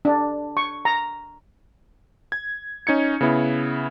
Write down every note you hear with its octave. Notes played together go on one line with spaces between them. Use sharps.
D4
C#6
A#5
G#6
C#4 D#4 G#6 C#7
C#3 B3 E4